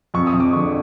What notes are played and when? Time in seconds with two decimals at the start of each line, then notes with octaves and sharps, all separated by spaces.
0.14 F2 C#6
0.27 D#6
0.34 F2
0.40 D6
0.53 D3 C#6